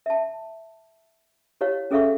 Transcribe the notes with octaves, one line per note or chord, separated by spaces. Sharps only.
E5 A5
E4 G4 C#5 F5
C#4 G#4 A4 E5 F5 C#6